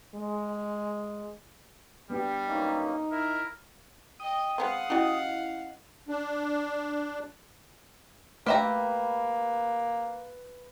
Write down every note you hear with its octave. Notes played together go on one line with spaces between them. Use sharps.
G#3
G3 B3 D4 G4
F#2 A#3 C#4 D#4
E4 A#4 E5
D#5 G5 D#6
G#3 B3 C4 F5 F#5
C#4 E4 F#4 G4 D#5
D4
A3 A#3 G4 B4 E5 G5 A#5